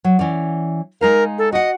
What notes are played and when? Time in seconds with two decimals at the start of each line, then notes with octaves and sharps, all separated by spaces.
0.04 F#3
0.19 E3 C#4 D5
1.01 G#3 D#4 A#4 F5
1.38 A4
1.52 F#4 D#5 F#5